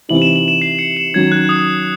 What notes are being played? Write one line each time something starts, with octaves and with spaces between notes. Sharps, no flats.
C3 E3 C4 D#4 F#7
E7
F#7
E7
C7
C#7
E7
D#3 F#3 C#4 G#6
F#6
D#6